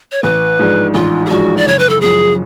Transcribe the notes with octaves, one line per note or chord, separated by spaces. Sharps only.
C#5
A1 B4
G#2 F3 G#3 D4
A1 F4
G#4
G#2 F3 G#3 D4 F#4
D5
F#1 C#5
B4
A4
F#2 F3 G#3 G#4